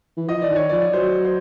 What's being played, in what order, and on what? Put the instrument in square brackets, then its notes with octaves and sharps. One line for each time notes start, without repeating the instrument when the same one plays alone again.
[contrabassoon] E3
[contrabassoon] F3 [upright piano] D#5
[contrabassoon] E3 [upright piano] D5
[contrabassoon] D#3
[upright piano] C#5
[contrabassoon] F3 [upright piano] D5
[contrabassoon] F#3 [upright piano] C5
[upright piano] C5